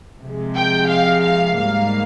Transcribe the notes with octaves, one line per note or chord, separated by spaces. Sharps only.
C3 F3 G#3
G5
F5
F5
G#2 G3 A#3 F5